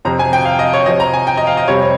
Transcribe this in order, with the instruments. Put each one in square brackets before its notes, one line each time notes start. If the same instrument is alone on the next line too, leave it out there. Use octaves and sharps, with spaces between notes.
[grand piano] F2 C3 F3 C4 A#5
G#5
G5
F5
D#5
C#5
C3 F3 C4 D#5
A#5
G#5
G5
D#5
F5
D#5
F2 C3 G3 C4 C#5